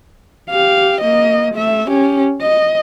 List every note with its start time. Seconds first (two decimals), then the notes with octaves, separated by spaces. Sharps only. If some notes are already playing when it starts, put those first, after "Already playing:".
0.50 G4 F5
1.01 A#3 D#5
1.54 A3 E5
1.88 C#4 G4
2.42 D#5